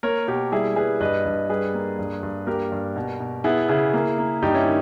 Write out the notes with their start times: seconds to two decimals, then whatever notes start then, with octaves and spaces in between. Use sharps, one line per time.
0.03 A#3 A#4 C#5
0.27 B2 G4 A#4
0.52 G3 E4 G#4
0.76 G3 G#4 B4
1.00 G2 B4 D#5
1.25 G2
1.49 G3 G#4 B4
1.74 A#3
1.99 G2
2.23 G2
2.47 A#3 G4 A#4
2.72 G2
2.96 B2
3.20 B2
3.44 B3 E4 G#4
3.69 C#3 E4 G#4
3.94 A#3
4.18 A#3
4.42 G2 D#4 G4
4.54 C#4 E4
4.66 D#3